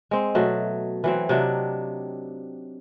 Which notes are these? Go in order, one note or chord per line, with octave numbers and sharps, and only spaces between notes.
G#3 C4
B2 F#3 A3
E3 F#3 C4
C3 F#3 D4 D#4